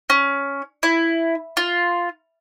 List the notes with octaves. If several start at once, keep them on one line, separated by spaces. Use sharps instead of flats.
C#4
E4
F4